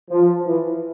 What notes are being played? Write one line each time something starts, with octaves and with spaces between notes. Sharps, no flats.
F3
E3